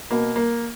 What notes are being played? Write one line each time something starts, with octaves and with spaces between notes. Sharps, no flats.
B2 A#3
A#3